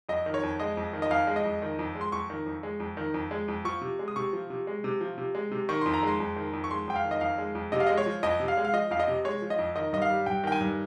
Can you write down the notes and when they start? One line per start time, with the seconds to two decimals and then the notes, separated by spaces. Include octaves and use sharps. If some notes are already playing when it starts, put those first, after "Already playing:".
0.09 F2 D#5
0.26 D#3
0.34 C#5
0.43 F2
0.59 G#3 D#5
0.77 F2
0.93 D#3
1.02 D#5
1.11 F2 F5
1.27 G#3
1.36 D#5
1.45 F2
1.62 D#3
1.79 F2
1.95 G#3
2.01 C6
2.12 F2 C#6
2.30 D#3
2.46 F2
2.63 G#3
2.80 F2
2.97 D#3
3.14 F2
3.31 G#3
3.48 F2
3.65 F3 C#6
3.81 C3
3.99 G#3
4.08 D#6
4.16 C3 C#6
4.33 F3
4.50 C3
4.67 G#3
4.84 C3
5.01 F3
5.18 C3
5.35 G#3
5.51 C3
5.69 D#3 C#6
5.81 F2 C6
5.93 A#5
6.03 G#3 C6
6.20 F2
6.36 D#3
6.53 F2
6.64 C#6
6.70 G#3 C6
6.87 F2 G5
6.96 F5
7.04 D#3
7.11 D#5
7.21 F2 F5
7.38 G#3
7.55 F2
7.72 C3 D#5
7.80 F5
7.87 G#3 D#5
7.98 C#5
8.06 F3
8.23 F2 D#5
8.40 C3
8.48 F5
8.57 G#3
8.65 F5
8.74 F3 D#5
8.91 F2 F5
9.00 D#5
9.08 C3
9.24 G#3 C#5
9.42 F3
9.50 D#5
9.59 F2
9.76 D#3 D#5
9.93 G2 D#5
10.02 F5
10.10 G3
10.26 G2 G5
10.44 D#3 G5
10.52 G#5
10.60 G2